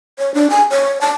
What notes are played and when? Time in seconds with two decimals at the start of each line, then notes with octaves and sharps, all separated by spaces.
0.19 C#5
0.34 D4
0.50 G#5
0.71 C#5
1.01 A5